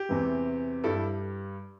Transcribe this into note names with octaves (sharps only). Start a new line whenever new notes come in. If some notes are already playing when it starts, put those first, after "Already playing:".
Already playing: G4
E2 C3 E3
G2 G3 E4 A4